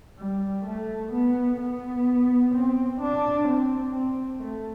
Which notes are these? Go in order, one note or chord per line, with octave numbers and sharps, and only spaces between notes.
G3
A3
B3
B3
C4
D4
C4
C4
A3